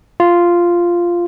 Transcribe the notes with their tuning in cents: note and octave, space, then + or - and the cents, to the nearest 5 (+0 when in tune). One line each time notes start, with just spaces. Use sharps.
F4 -5